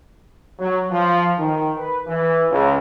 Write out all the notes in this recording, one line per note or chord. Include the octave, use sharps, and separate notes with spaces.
F#3
F3
D#3
B4
E3
C#2